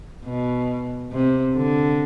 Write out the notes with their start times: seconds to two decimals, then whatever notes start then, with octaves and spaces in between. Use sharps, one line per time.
0.25 B2
1.12 C3
1.55 D3